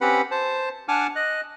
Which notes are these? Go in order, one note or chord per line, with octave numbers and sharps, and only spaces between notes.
C4 C#4 G4 B4 F#5 B5
C5 A5
D4 F#5 G#5 A5 D6 F6
D#5 F#6